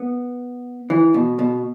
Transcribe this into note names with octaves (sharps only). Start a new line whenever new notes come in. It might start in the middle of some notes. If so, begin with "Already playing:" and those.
Already playing: B3
E3
B2
B2